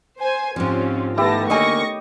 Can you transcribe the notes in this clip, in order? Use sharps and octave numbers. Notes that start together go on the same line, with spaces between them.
C5 G#5
G#2 F3 C4 C#4 F4 G4
D#3 A3 B3 E4 G4 A5 A#6
D3 A#3 C#5 D#5 G#5 C#6 A#6